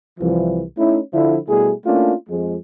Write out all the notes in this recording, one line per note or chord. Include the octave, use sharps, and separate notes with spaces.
C2 E3 F3
A3 C#4 D#4 E4
D3 F3 E4
B2 G3 A3 E4 G#4
A3 A#3 C#4 D4 E4 F4
F2 G#3